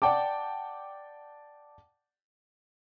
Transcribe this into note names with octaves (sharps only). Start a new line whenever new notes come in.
D5 F#5 G5 A5 D6